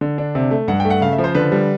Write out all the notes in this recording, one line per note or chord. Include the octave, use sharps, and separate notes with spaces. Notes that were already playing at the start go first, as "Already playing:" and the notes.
D3
D4
C3
A3
G2 F#5
G5
A3
F#5
C#3 F5
E5
F3
C5
D3 B4
G3